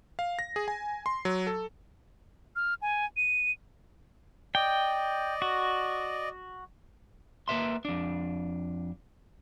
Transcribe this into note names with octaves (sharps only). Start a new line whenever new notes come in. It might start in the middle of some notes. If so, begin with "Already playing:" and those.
F5
A#6
G#4
G#5
C6
F#3
A4
F6
G#5
D#7
D5 D#5 G5
F#4
A#3 B4 E5 C6
F2 D4